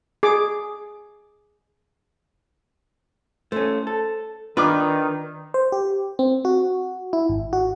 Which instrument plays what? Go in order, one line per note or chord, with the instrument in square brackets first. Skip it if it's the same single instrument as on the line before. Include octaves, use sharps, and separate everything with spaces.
[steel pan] G#4 D6
[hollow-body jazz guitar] A3 C#4 [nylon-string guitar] C5
[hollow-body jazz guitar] A4
[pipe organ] D#3 [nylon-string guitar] D4 [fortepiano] F4 D6 [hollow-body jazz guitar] B4
[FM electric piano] C5
G4
C4
F#4
E4
G#1
F#4